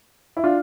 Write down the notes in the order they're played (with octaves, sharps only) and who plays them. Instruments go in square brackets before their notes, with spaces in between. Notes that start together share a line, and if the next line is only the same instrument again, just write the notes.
[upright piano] E4
D4 F4